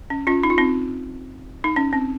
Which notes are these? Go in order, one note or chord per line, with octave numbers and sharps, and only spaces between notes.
C#4
C#4 F4
D#4
F4
C4 D#4
D#4
C#4
C4